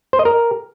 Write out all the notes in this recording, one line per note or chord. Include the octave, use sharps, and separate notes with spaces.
C5
D#5
A#4